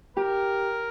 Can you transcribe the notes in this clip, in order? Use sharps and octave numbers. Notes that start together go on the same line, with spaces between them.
G4 A#4